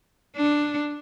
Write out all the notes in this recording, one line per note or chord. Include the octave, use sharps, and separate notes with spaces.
D4